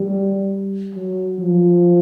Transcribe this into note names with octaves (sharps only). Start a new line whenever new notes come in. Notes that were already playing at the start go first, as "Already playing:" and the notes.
Already playing: G3
F#3
F3